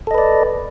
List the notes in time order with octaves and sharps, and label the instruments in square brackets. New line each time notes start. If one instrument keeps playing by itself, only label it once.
[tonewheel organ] A4
D#5
B4
D5